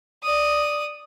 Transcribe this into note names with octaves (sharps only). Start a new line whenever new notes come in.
D5 D#6